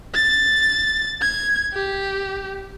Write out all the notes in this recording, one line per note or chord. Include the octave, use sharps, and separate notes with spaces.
A6
G#6
G4